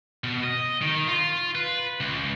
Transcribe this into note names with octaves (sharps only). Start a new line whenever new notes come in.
B2
D#5
D#3
F4
B4
C#2